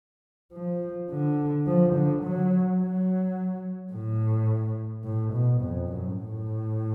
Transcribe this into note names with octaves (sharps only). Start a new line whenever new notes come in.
F3
D3
F3
D3
F#3
F#3
A2
A2
B2
F2
F#2
A2